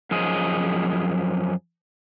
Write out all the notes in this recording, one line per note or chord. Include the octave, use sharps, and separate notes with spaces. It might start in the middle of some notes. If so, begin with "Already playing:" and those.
F#2 F3 G#4 D#5